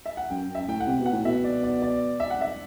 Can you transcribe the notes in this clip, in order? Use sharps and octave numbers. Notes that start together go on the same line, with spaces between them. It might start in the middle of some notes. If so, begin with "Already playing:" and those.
E5
F#5
F#2 G5
F#2
E5
A2 G5
F#5
C3
B2
F#5
A2
B2 E5
D5
D5
D5
E5
F#5
E5